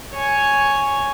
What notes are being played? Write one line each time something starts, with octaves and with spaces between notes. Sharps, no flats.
C#5 G#5